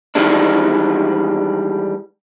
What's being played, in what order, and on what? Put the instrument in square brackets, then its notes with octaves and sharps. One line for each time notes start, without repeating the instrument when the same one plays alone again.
[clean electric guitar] D#3 E3 G3 G#3 D4